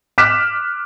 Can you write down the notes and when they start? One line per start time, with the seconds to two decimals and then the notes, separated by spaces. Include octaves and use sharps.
0.18 D6 F6 F#6 B6 E7